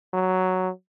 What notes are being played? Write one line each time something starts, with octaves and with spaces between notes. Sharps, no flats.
F#3